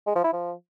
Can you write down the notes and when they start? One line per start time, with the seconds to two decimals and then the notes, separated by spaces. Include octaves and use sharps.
0.07 G#3
0.16 F3
0.24 E4
0.33 F3